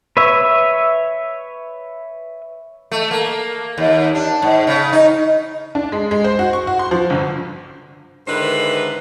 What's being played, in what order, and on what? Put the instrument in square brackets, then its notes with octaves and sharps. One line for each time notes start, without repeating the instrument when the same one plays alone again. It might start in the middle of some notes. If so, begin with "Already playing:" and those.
[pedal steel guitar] B4 C#5 E5
[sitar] A3
A#3
D#2
D4
G#2
C#3
D#4
[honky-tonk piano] D4
G#3
G#3
C5
F#4
C#6
F#4
C6
F3
G1
[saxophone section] G#2 D3 D#3 E4 B4 C5